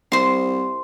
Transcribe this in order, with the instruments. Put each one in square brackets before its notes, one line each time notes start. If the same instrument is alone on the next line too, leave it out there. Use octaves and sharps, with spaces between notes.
[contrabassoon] C2 [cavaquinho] C5 C6